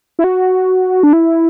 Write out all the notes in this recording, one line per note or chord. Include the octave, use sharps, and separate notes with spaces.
E4
F#4
D4
E4